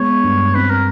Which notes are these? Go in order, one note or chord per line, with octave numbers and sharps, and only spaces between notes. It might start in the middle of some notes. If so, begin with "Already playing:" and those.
Already playing: G#3 B3 C#5
G2
C4 B4
A#4